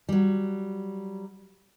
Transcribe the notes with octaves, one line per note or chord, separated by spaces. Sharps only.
F#3 G3